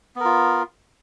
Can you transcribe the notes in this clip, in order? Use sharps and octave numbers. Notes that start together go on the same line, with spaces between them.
B3 F4 A#4